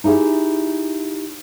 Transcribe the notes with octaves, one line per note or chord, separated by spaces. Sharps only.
D#4 E4 G4 G#4 E5